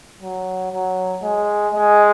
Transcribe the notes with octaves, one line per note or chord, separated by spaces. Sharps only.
F#3
F#3
G#3
G#3